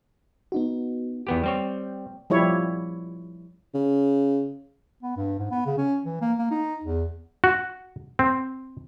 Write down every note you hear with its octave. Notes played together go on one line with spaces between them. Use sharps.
B3 D#4 F#4
E2 B3 G4 G5
G3 C4 C#5
F3 G3 E4 C#5
C#3
B3
G2
G#2
B3
C#3
C#4
E3
A#3
A#3
D#4
E2
F#4
C4